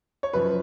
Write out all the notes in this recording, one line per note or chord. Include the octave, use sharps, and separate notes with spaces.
C#5
F#2 F3 B4